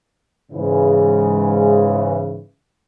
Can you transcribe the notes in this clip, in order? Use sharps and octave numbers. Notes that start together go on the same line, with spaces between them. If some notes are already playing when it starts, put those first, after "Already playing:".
G#2 C#3 E3